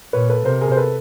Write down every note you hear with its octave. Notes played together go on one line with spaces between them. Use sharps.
A#2 B4 C#5
A4 B4
C3 A#4 C5
G#4 A#4
C5
A4 B4